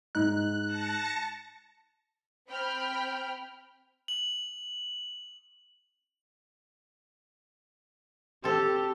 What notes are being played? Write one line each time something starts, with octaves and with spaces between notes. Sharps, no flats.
G#2 D#4 F#6
A5 A#6 C#7
C4 G5 B5 F6
F#7
C4 G4 A4